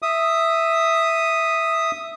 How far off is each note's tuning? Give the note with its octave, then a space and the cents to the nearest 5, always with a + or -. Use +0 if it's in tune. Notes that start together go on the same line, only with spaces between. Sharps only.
E5 +0 D#6 +0